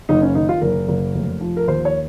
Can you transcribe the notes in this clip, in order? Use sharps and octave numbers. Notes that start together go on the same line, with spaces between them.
F#1 D#4
C#4
D#3 D#4
F4
F#1 A#4
F#1
F1
F3
A#4
D#2 C5
C#5